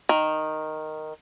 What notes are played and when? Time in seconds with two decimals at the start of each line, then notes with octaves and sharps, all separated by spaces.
0.09 D#3